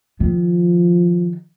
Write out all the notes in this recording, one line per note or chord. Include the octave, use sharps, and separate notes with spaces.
D#3 F3